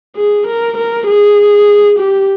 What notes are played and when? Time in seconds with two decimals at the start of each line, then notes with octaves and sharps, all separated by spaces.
0.16 G#4
0.47 A#4
0.77 A#4
1.07 G#4
1.98 G4